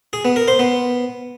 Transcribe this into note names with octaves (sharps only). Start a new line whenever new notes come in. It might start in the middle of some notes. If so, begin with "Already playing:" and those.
G#4
B3
A#4
C5
B3